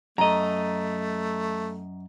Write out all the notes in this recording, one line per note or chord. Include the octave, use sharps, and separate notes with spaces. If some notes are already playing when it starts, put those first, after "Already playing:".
F#2 A3 D#5 A#5